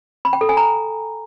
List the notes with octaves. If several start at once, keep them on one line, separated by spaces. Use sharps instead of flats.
B5
G5
A4
G#5
A#5